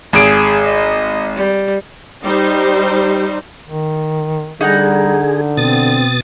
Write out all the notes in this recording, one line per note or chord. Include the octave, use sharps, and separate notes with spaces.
G#1 G#4 D7
D#5
G3
G3 D#4 C5
D#3
D3 G3 D#4 G#4 F#5 A#5
B2 C4 D#6 A6